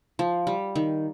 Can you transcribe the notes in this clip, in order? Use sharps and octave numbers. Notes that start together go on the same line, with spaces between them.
F3
G3
D#3